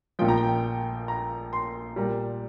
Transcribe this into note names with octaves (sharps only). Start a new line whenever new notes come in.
A#1 A#2 F3 G5
A#5
G5
A#5
C6
A#2 G3 A#5